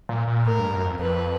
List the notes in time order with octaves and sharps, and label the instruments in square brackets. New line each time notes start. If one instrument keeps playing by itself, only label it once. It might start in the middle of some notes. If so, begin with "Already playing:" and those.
[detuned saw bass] A#2
A#2
[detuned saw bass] A2 [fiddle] A#4
[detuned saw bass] G2
F#2
F2
[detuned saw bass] F2 [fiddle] B4